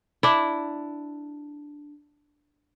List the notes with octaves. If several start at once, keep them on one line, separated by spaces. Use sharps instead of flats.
D4 E4